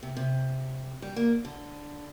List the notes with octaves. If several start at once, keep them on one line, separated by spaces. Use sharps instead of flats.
C3
C3
G3
A#3
D3